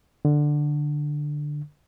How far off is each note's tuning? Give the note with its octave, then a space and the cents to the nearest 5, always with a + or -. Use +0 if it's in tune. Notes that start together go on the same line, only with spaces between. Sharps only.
D3 +10